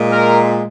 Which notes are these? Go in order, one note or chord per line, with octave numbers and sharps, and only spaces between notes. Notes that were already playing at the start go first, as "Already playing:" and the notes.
Already playing: A#2 G#3
A#4